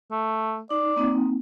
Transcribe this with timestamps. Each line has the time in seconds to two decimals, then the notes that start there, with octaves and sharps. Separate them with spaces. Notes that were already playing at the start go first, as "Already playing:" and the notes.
0.11 A3
0.71 D#4 D5
0.96 A#3 C4 D#4